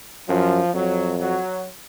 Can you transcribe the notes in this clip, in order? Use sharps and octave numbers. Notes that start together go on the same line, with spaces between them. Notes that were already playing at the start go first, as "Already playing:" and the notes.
F#2 F3
F2 F#3
F#3